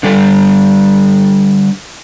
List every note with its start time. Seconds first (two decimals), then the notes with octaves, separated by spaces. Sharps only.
0.03 D3 G3 A4